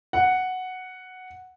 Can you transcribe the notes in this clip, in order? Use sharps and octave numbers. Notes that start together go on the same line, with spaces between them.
F#5